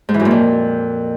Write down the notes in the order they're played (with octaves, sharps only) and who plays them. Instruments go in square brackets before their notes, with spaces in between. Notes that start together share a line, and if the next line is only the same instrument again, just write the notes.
[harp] G#2
E3
F#2
A#2
F2